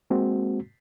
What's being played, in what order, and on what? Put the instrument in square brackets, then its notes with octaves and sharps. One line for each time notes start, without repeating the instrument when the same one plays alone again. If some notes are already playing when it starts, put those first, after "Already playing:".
[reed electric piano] G#3 A#3 C4 F#4